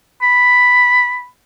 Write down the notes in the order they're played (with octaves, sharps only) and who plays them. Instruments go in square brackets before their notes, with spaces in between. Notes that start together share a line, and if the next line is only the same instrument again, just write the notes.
[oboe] B5